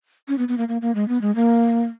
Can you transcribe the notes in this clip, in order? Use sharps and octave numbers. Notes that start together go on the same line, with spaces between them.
C#4
B3
B3
A#3
A#3
A#3
G#3
B3
G#3
A#3